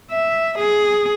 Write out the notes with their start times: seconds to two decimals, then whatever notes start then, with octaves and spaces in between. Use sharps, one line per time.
0.11 E5
0.59 G#4